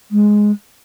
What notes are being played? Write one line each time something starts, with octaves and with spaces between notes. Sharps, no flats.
G#3